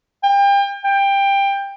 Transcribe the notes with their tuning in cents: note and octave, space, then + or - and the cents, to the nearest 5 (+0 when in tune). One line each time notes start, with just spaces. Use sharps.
G5 +35
G5 +15